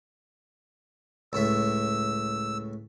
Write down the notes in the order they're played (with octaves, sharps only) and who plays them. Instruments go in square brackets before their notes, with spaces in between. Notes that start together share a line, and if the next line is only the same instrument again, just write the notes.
[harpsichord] C#2 A2 E5 [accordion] E6